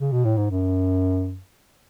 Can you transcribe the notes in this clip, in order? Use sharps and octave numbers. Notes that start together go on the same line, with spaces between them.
C#3
B2
A2
G#2
F#2